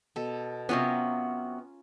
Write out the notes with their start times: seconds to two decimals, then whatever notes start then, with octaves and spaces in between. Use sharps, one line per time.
0.16 B2 A4
0.69 C3 F#3 B3 C#4 F4 A#4